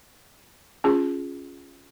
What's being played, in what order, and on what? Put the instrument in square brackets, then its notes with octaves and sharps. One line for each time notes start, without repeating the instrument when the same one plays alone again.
[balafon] C#4 F4 G#4